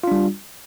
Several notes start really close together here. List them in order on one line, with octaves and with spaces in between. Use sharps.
F4 D4 G3